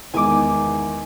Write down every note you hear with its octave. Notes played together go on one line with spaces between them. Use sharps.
E2 D#3 G#3 G#5 D6